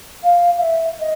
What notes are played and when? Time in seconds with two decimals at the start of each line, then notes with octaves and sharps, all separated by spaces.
0.23 F5
0.57 F5
0.61 E5
0.99 D#5